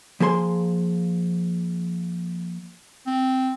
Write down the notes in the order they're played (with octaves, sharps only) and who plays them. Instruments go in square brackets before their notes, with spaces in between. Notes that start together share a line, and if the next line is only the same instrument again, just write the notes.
[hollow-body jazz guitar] F3 A#3 G#4 C6
[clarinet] C4